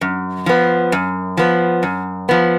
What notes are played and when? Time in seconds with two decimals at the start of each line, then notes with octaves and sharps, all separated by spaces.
0.01 F#2
0.46 F3 B3
0.92 F#2
1.37 F3 B3
1.83 F#2
2.29 F3 B3